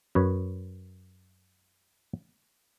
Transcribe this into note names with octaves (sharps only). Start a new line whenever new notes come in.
F#2 B4 C#5